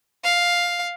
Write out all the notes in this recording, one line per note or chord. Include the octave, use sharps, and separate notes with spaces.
F5